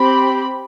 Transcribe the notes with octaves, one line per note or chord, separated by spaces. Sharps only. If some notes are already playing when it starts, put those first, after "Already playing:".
Already playing: C4 G4 B5